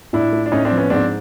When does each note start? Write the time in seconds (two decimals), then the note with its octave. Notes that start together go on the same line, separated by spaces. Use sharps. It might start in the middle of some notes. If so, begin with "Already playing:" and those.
0.13 A2 D4 E4
0.32 A3
0.46 D4
0.52 A2 C#4 D#4
0.65 C4 D4
0.72 F3
0.77 B3 C#4
0.90 G#2 C4 D4